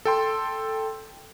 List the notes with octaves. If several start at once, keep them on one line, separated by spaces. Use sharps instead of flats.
A4 G5 C6